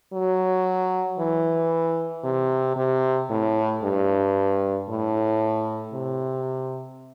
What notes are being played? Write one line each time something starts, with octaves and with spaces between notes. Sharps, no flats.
F#3
E3
C3
C3
A2
G2
A2
C3